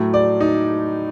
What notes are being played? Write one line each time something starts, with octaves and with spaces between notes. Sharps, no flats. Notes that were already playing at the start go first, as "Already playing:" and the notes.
Already playing: A2 F#3 A3
D5
D#4